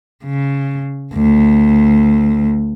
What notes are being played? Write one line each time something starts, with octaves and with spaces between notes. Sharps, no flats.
C#3
D2